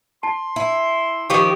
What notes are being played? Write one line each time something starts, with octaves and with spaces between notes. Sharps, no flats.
A5 C6
E4
D#3 F3 G4 C#6